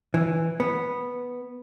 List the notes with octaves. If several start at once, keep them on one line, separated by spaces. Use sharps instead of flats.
E3
B3